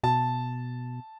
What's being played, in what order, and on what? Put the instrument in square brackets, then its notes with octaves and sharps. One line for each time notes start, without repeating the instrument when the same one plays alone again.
[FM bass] B2 [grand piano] A5